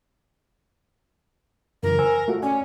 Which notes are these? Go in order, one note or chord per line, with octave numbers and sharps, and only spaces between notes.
F#2 C#3 E3 A#4
C5 G#5 E6
A3 F4 F#4
C#4 D5 G#5